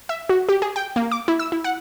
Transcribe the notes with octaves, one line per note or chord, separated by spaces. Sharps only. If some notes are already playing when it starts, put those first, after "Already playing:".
E5
F#4
G4
G#4
G5
A#3
D6
E4
E6
E4
F#5